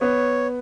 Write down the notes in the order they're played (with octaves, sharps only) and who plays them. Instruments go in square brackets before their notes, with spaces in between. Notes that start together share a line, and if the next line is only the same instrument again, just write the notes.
[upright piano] B3 [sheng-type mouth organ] C#5